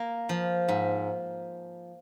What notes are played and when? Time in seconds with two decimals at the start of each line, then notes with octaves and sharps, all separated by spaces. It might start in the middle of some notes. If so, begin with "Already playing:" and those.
Already playing: A#3
0.29 F3
0.69 G#2